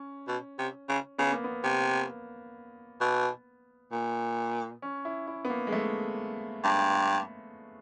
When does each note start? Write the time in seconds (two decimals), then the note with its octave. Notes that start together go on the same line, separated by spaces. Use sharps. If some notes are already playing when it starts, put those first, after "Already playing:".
Already playing: C#4
0.28 B2
0.58 C3
0.89 C#3
1.18 C#3 B3
1.32 A#3
1.44 B3
1.64 C3
3.01 B2
3.92 A#2
4.82 C#4
5.05 E4
5.27 E4
5.45 B3
5.50 A#3
5.67 G#3
5.72 A3
6.64 G2